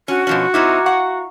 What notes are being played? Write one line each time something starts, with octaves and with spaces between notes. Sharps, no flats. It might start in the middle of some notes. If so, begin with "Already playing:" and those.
C#4 F#4
B2 F3 C#4
C4 D#4 E4 D6 F6 G#6
A#5
F5 F#5 A#5 C#6